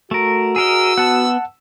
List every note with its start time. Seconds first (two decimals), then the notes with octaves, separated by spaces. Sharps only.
0.11 A3 F#4 A#4
0.56 G#4 A#4 D#5 E6
0.98 B3 F#5 A5